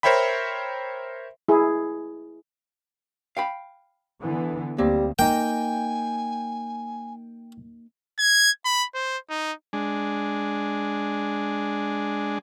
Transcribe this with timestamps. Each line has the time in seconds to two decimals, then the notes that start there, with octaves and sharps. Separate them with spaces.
0.03 A#4 C5 C#5 E5 G5 B5
1.48 E4 G#4
3.37 F5 G5 B5
4.21 D3 E3 B3
4.78 D2 G3 A#3 C4
5.19 A#3 D#4 G5 G#5
8.19 G#6
8.65 B5
8.94 C5
9.30 D#4
9.73 G#3 D4